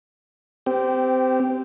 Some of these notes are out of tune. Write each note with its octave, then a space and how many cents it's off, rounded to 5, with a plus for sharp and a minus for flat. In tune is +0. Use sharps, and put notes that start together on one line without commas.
C4 -25 G4 +0